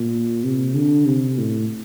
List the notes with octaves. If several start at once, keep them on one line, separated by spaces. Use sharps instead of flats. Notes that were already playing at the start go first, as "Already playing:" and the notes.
Already playing: A#2
C3
D3
C3
A2